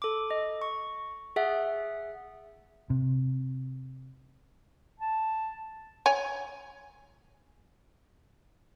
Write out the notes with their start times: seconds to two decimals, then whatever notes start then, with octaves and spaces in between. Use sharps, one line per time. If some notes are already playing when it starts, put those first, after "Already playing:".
0.02 A4 D6
0.31 D#5
0.62 C#6
1.36 G#4 E5 F#5
2.90 C3
5.00 A5
6.06 C#5 G#5